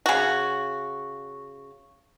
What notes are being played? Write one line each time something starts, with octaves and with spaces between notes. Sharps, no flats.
C#3 F#4